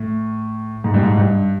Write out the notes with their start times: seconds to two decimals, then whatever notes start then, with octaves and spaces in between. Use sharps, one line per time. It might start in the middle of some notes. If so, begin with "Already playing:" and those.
Already playing: A2
0.84 G#2
0.94 G2
1.03 G#2
1.17 G2